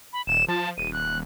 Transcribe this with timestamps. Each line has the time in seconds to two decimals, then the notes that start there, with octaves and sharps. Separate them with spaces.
0.13 B5
0.27 D#1 E7
0.48 F3 A5
0.78 D#1 D#7
0.93 F#6